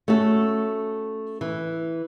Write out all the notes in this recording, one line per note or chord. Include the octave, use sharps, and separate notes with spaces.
A3 C#4 F#4 A4
E3